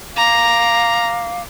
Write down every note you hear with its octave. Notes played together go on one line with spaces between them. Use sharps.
F5 A#5 D6